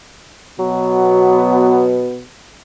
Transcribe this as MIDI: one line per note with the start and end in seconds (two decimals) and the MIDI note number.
0.59 2.23 47
0.59 2.00 54
0.59 2.23 59